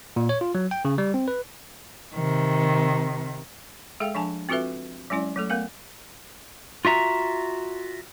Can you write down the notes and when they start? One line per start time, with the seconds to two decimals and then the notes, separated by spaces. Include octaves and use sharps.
0.16 A#2
0.29 C#5
0.41 F4
0.55 F#3
0.71 G5
0.85 C#3
0.98 G3
1.14 C4
1.28 B4
2.14 C3 D#3
4.00 G#3 G#4 A4 F5 G5
4.15 F3 D4 G#5 A5
4.49 C4 F4 F#4 A4 B4 E5
5.10 F#3 G#3 C#4 E4 D5
5.36 F#3 A3 A4
5.50 A3 B3 A#4 F5
6.85 F4 F#4 E5 A#5